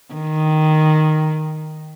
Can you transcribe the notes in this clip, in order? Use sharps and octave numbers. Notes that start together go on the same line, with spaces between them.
D#3